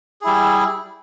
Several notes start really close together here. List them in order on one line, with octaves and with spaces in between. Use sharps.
G#4 E4 G3